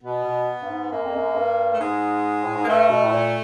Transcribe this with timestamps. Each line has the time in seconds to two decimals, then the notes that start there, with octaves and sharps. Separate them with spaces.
0.03 B2 B3
0.25 B2
0.62 G2
0.70 G#2
0.91 F#2 A#3
1.03 F2
1.16 F#2
1.35 G2
1.73 A3
1.79 G#2 G#3
2.44 A2
2.56 G#2
2.64 A#3
2.68 G2 A3
2.89 B2
3.04 A2
3.11 A#2